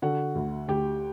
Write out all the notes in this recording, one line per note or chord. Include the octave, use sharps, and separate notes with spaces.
D3 F#4 F#5
D2
D2 G4 G5